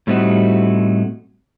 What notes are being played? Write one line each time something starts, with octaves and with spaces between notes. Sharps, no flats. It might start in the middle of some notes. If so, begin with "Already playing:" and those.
A2 G3 A3 C4 D#4 F#4